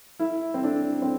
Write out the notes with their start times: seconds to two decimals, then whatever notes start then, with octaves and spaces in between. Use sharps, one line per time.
0.19 E4
0.54 C4
0.64 D4
1.02 C4